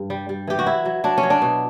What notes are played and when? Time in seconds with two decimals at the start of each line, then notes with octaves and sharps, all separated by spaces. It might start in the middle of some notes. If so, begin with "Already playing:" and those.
Already playing: G2
0.10 G3
0.29 G3
0.47 E3 G4
0.59 F#4
0.66 F#3 E4
0.85 F#3
1.04 F#3 D4
1.18 C#4
1.23 F#3
1.30 D4
1.42 B2